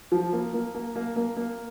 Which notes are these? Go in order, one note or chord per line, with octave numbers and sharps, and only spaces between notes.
F3
A#3
A#3
A#3
A#3
A#3
A#3